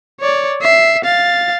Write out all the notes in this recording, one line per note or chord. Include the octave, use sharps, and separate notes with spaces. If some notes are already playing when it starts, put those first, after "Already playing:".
C#5 D5
E5 C7
F5 A6